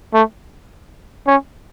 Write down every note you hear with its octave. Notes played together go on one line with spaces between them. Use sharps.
A3
C#4